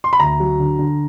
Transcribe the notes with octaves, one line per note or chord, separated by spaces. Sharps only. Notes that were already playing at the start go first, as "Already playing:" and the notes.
C6
B5
D2 A#5
F#3
D3
D3